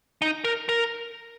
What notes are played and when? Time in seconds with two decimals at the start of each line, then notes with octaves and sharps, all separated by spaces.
0.22 D#4
0.44 A#4
0.69 A#4